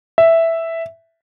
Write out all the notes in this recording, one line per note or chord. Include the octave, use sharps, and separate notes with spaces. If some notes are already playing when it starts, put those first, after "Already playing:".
E5